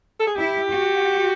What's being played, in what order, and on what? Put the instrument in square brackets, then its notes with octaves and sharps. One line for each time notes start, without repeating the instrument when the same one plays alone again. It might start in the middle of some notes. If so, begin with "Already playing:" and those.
[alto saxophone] A4
G#4
[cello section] E4 [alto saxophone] G4
[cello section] F#4